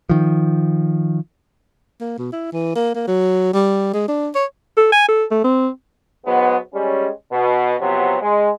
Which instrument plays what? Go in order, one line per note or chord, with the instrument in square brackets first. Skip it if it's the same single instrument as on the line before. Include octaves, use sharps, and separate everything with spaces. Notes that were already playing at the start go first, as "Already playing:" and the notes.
[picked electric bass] D#3 F3
[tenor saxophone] A#3
B2
E4
E3
A#3
A#3
F#3
G3
G#3
D4
C#5
[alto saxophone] A4
G#5
A4
A3
C4
[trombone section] G#2 F#3 G#3 B3
G3 G#3 C#4
B2
C3 F3 F#3 B3 C4
G#3